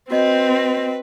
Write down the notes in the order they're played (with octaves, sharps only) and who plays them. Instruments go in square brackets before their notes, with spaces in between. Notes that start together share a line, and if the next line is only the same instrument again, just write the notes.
[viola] C4 [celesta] F#4 D#5 [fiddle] B4